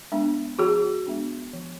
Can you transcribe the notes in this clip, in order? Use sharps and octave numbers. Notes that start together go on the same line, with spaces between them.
G#3 B3 D4
F3 F#4 G#4
G#3 B3 D4
F3